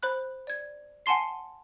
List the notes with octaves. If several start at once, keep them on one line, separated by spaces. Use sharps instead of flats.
C5 B5 F#6
D5 G#6
F#5 G#5 A5 C6 C7